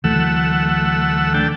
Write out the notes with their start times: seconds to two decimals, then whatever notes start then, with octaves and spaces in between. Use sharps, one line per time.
0.04 D2 E3 F#3 A3 F#5 E6
1.34 D3 G5 A5